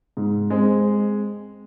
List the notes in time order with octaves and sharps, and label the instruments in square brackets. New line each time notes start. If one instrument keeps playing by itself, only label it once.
[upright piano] G#2
G#3 C4